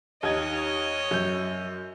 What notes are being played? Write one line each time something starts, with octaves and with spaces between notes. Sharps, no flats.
D#2 D#4 C#5 D#5 G#6
F#2 G6